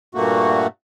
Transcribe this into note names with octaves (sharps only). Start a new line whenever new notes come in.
G2 A#2 A3 A#3 F#4